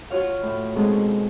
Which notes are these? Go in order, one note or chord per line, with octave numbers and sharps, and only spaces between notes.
F4 F#4 C#5 F5
A2
B2 G#3 C4 D#4 G#4 A4